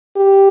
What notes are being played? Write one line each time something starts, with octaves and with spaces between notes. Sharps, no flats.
G4